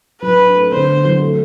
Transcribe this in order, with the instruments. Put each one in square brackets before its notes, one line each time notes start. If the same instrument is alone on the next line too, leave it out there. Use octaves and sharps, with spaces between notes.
[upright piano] F#3 [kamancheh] B4
[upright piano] D4
A3
[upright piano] D3 [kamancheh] C5
[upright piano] B3
F#3
A3